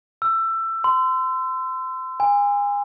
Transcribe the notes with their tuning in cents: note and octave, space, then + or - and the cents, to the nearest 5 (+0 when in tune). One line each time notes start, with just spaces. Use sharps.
E6 +20
C6 -30
G#5 -30